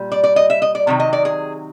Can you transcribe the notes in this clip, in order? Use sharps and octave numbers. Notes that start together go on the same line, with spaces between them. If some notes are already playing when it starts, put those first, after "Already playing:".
Already playing: A#2 G3
D5
D5
D#5
E5
D#5
D5
C3 D#3 F#3
D#5
D5
G#4